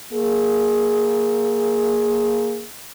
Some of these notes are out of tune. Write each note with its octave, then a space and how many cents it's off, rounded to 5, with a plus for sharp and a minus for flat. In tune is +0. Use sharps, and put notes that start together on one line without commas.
A#3 +0 G#4 +0